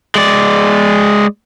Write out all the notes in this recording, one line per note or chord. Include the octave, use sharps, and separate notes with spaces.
G#3 D5